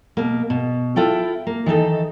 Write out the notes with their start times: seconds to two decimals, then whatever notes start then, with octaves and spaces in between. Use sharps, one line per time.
0.17 B2 A#3
0.50 B2
0.96 E4 F4 A4 G5
1.47 A#3
1.66 D#3 E3 D#4 A4